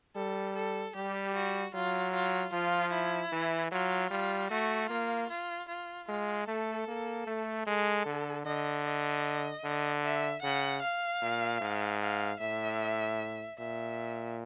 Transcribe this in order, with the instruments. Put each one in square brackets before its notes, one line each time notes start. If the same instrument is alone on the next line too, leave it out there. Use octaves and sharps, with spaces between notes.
[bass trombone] G3 [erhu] A4
[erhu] A4
[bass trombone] G3 [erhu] G4
[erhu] F#4
[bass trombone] F#3 [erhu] F4
[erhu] F4
[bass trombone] F3 [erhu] F4
[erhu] E4
[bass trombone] E3
[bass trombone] F#3 [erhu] F4
[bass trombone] G3 [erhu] F4
[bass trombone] A3 [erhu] F#4
[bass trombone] A#3 [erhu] F4
[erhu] F4
F4
[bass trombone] G#3 [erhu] F4
[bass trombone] A3 [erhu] A4
[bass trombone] A#3
A3
[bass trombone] G#3 [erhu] A4
[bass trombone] D3
[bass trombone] D3 [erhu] D#5
[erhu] D#5
[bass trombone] D3
[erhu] E5
[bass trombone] C#3 [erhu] F#5
[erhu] F5
[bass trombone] A#2
G#2
[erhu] F5
[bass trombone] A2 [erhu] E5
[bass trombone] A#2 [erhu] E5